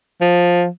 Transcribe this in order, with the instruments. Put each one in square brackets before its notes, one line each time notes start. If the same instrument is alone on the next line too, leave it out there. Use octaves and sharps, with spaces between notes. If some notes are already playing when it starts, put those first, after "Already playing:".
[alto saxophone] F3